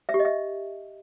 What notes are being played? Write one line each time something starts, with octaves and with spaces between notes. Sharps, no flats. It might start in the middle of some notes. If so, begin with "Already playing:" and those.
E5
G4
D#5
E5